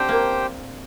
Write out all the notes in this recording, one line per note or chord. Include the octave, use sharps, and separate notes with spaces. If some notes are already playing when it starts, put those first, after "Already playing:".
Already playing: C4 D4 F#4 G4 C5 G5
A#3